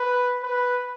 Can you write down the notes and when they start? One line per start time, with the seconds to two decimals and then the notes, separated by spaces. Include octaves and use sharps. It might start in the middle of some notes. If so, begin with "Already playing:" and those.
Already playing: B4
0.43 B4